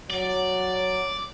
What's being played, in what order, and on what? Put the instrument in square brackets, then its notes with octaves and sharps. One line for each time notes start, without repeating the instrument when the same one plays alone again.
[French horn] F#3 [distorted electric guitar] D5